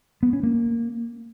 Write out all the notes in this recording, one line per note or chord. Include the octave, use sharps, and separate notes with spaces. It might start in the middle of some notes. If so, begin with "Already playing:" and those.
B3
C#4
A#3